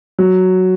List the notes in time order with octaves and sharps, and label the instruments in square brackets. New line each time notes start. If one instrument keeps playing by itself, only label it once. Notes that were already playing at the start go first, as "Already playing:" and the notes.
[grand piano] F#3